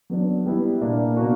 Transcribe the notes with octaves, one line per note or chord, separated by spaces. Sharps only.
F#3 B3 D4
G3 B3 E4
A#2 A#3 D4
B2 A#3 D4 F#4